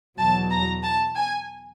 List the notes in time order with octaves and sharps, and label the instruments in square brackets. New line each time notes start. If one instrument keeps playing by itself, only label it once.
[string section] E2 B2 F#3 A5
A#5
A5
G#5